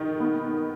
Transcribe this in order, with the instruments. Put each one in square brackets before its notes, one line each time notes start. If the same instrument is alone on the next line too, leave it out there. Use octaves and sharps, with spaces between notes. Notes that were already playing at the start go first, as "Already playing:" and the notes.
Already playing: [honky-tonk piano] D#3
B3